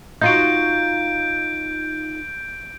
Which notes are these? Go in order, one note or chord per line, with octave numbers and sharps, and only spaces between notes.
D#4 F4 F#4 G6 D7